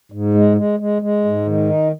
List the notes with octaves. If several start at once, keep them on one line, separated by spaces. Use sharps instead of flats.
G#2
G#3
G#3
G#3
G#3
G#2
D#3
D#4